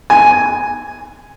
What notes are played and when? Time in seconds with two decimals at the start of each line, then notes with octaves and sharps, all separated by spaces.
0.10 G#5